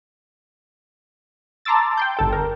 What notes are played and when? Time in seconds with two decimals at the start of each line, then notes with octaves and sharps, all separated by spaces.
1.65 A5 A#5 C6 D6 E6 A6
1.97 G5 C6 G6
2.17 G1 A4 G5
2.32 A#4